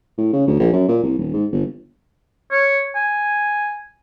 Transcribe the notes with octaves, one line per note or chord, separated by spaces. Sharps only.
A2
C#3
D2
A#1
F#2
A#2
C2
D#1
G#2
G1
C#5
G#5